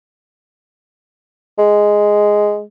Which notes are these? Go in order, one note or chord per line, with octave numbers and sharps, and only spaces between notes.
G#3